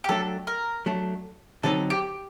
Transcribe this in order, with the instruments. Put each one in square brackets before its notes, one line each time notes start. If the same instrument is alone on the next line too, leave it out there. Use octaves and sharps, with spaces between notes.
[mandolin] G4
[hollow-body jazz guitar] F#3 A3 D4 [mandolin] A4
[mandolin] A#4
[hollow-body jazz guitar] F#3 A3 D4
[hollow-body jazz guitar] D3 F#3 C4 D#4 [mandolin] A4
[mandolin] G4